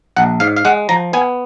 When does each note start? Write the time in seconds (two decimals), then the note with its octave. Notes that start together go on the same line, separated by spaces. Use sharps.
0.16 A#1 F#5
0.40 G#2 F5
0.56 F5
0.65 G#3 F#5
0.89 F3 A#5
1.13 B3 G#5